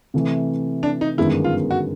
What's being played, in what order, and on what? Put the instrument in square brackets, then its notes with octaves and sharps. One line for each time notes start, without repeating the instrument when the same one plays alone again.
[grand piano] C3 E3 A3
[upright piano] D4
D#4
[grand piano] G1 F#2 D#3 G#3 B3 [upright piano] E4
[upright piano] F4
F#4